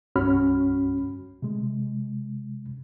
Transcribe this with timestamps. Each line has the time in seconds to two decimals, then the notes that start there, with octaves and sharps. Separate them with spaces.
0.16 C2 G2 C#4 F#4 B5 F6
1.42 C3 G#3